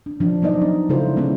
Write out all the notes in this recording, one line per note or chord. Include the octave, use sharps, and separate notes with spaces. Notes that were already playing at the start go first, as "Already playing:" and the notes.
D4
F3 D4
F#3 B3 D#4 D5 D#5
D4
C#3 G#3 E4 F4 A4 C5
F3 G#3 B3 C#4 E4